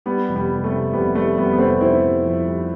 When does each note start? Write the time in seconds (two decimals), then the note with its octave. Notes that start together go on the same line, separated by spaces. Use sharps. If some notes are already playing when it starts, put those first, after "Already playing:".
0.06 G3 B3
0.29 F1
0.35 G3 B3
0.50 F1
0.64 A3
0.72 C3
0.93 F1 G3 B3
1.15 G3 A3
1.37 F1 G3 B3
1.53 B3
1.58 F1 A3 C4
1.80 F1 C4 E4
2.03 G3
2.25 F2
2.47 G3